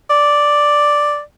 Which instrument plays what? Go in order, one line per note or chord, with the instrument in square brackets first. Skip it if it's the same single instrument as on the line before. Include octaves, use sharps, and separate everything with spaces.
[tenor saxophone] D5